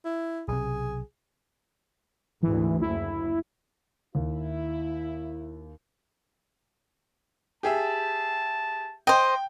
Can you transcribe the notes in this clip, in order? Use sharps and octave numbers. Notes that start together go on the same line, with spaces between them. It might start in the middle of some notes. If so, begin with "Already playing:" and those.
E4
B1 C3 G#4
G#1 D2 E3
F#1 E4
D#2 E4
G4 G#4 E5 A5
C5 D#5 G5